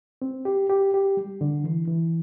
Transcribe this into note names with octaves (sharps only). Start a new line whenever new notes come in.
C4
G4
G4
G4
G3
D3
E3
E3